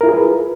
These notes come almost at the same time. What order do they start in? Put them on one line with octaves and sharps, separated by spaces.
A#4 E4 F4 G#4 B4